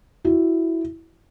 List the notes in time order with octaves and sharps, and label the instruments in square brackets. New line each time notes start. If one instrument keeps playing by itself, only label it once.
[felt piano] E4 F#4